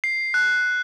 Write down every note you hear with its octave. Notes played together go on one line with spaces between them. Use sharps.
C7
F#6